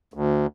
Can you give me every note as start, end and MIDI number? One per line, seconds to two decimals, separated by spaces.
0.14 0.46 38